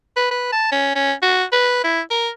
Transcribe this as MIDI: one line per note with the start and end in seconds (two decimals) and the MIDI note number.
0.16 0.27 71
0.31 0.50 71
0.52 0.68 81
0.72 0.91 61
0.95 1.13 61
1.22 1.44 66
1.52 1.80 71
1.84 2.01 64
2.11 2.29 70